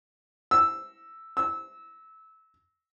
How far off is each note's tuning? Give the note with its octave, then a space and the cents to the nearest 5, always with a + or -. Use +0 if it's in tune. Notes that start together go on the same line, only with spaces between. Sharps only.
E6 +0
E6 -20